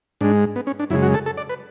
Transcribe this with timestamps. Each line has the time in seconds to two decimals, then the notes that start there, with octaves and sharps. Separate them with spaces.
0.21 G#2 G#3 D4
0.56 B3
0.67 C#4
0.79 D4
0.90 F#2 C#3 G#3 E4
1.03 F#4
1.14 A4
1.26 A4
1.37 D5
1.49 B4